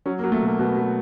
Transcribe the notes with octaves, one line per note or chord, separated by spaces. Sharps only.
F#3 C#4
A#3
F#3
A3
B2 A#3
B2 B3
F#3